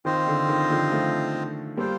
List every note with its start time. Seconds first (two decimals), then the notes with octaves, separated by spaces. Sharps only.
0.05 D#3 C4 F4 C5 D#5
0.27 D3
0.48 D#3
0.70 D3 F3
0.91 F3 A3
1.77 G3 A#3 F4 A4 C5 G5